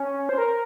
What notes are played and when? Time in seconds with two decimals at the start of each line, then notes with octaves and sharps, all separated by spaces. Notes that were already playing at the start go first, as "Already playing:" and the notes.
Already playing: C#4
0.29 C5
0.38 A#4